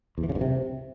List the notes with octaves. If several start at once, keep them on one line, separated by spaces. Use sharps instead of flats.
E2
E3
C#3
G2
C3